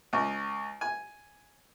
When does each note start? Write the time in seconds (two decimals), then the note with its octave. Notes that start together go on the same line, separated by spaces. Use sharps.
0.13 C#2
0.81 G#5